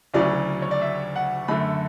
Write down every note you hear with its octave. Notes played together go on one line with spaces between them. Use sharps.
D2 C#3 F#3 C#4 E4 D5
C#5
D5
E5
F#5
F#2 D3 A3 B5